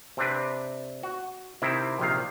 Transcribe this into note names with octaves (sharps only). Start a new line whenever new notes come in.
C3 C4 D4 B4
F#4
C3 D#3 C4 E4
A#1 C3 D#3 F5